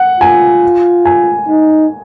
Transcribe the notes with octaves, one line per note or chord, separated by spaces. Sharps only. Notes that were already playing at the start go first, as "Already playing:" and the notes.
Already playing: F#5
F4 G#5
G#5
D#4